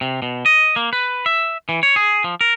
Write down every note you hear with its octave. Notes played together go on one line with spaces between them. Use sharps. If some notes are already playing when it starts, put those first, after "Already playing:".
C3
B2
D#5
A#3
B4
E5
E3
C#5
G#4
F3
A#4